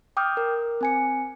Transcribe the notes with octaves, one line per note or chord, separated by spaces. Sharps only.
G5 D6 D#6 F6 G6
A#4
C4 G#5 C#7